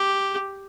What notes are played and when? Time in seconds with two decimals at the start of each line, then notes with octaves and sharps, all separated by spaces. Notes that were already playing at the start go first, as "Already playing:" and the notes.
Already playing: G4